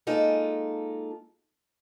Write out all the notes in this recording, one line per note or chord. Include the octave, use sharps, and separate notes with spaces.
G#3 A#3 D#4 F4 A4